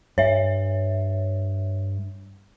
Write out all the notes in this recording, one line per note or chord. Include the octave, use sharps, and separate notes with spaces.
G2 C#5 E5